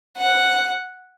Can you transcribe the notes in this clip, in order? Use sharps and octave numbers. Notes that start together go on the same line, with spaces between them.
F#5